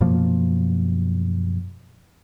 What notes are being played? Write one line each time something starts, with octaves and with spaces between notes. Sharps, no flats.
F#2 B2 F3 A#3